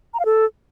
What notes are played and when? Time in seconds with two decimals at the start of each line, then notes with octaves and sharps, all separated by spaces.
0.14 A#5
0.20 F5
0.25 A4